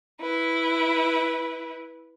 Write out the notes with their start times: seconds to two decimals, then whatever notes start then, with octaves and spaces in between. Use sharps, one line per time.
0.20 E4 B4